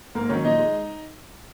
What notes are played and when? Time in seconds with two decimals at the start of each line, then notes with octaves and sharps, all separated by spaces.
0.15 G#2 A#3 A#4
0.29 D#3 F#3 C#4 C#5
0.44 A#2 D#4 D#5
0.59 G#3